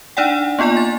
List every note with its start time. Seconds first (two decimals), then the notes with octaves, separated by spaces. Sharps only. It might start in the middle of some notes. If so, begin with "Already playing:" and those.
0.17 D4 D#4 D5 F#5 G5
0.59 A#3 B3 F4 D5 G#5
0.77 A6